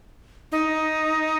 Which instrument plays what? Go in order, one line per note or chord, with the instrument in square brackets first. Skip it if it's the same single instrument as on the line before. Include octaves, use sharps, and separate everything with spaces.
[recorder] D#4